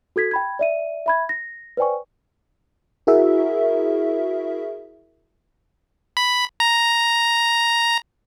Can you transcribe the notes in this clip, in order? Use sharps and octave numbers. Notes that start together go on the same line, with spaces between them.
F#4 A4 G#6 B6
G5 B5 G#6
D5 E5 D#7
E5 B5 G#6
A#6
B4 C5 D5 G5 G#5 C#6
E4 F#4 G#4 A#4 E5
B5
A#5